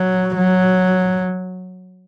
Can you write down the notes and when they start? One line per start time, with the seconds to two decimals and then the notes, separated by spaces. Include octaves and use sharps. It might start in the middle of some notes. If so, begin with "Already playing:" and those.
Already playing: F#3
0.37 F#3